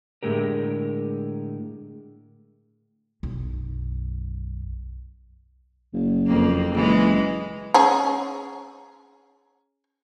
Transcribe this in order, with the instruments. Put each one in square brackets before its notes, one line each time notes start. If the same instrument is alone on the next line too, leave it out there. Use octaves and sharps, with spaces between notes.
[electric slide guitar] A2 D3 G#3 G4 A#4
[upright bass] B1 F#2
[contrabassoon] F#1
[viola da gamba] F2 A#3
[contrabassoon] F#1 [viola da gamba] E3 G#3
[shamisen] C#4 G#4 A#5